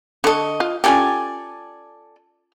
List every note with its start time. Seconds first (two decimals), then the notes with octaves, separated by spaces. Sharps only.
0.24 D3 A4 D#5 C#6
0.60 F4
0.84 C#4 F4 G4 A4 D5 G#5